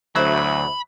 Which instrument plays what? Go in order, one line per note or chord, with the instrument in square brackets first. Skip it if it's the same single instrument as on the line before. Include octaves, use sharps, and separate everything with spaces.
[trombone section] D2 [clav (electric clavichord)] F#3 [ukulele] E4 C5 E5 [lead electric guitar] B5